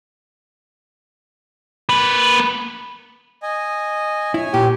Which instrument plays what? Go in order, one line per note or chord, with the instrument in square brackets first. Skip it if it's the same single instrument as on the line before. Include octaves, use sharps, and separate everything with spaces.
[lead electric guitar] A#3 B4
[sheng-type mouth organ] D#5 G#5
[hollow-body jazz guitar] E4 [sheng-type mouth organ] C#5 G#5
[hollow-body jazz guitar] A#2 [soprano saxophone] G4